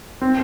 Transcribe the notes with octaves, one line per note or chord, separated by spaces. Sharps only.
C4